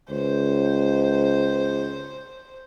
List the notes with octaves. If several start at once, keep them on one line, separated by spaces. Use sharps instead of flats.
C#2 C5